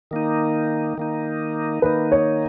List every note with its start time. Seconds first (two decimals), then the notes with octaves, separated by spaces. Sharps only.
0.11 D#3 A#3 D#4
0.97 D#3 A#3 D#4
1.82 D#3 A#3 D#4 B4
2.12 C#5